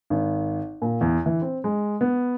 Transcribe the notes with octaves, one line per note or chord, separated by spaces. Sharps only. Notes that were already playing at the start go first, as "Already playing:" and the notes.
G#1
A#2
E2
E3
C4
G#3
B3